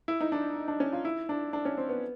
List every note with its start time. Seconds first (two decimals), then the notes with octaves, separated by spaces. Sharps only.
0.08 E4
0.21 D#4
0.32 D4
0.68 D4
0.80 C#4
0.93 F4
1.05 E4
1.29 D4
1.53 D4
1.65 C#4
1.77 C4
1.89 B3